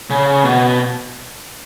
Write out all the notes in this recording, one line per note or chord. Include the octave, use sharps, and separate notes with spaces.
C#3
B2